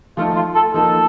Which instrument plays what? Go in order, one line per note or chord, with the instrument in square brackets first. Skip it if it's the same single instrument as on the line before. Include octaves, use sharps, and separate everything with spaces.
[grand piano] F3 A3 D#4 A4 [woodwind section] F4
[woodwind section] F4
A4
[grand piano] F3 A#3 D#4 [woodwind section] A4